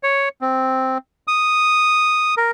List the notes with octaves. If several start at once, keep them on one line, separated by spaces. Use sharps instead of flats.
C#5
C4
D#6
A#4